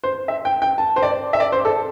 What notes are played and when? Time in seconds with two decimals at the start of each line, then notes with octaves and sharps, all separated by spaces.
0.04 C5
0.28 E5
0.45 G5
0.62 G5
0.78 A5
0.96 C5
1.03 D5
1.33 E5
1.40 D5
1.52 C5
1.65 A4